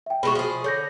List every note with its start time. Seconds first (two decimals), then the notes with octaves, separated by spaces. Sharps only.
0.06 E5 G5
0.23 B2 G#3 F#4 B5 C#6
0.35 F3 G#4
0.64 D3 C#5 G6 A#6